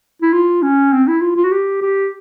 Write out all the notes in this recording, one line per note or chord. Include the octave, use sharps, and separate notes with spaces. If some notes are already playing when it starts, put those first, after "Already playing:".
E4
F4
C#4
C4
E4
F4
F4
F#4
G4
G4